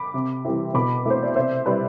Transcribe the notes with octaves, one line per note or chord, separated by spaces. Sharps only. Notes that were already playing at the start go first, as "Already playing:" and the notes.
Already playing: B5 D6
C3
E3 G3 C4 E4
B2 B5 D6
A3 C4 E4 C5
D5
C3 C5 E5
G3 C4 E4 B4 D5